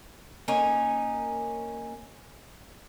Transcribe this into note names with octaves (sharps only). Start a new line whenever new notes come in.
A#3 C#4 D#4 G#5